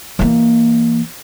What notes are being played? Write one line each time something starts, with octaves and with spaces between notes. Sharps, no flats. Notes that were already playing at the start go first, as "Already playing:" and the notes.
E3 A#3